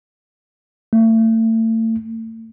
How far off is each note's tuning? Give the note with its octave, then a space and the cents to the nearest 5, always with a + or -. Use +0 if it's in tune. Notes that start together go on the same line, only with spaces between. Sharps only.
A3 +35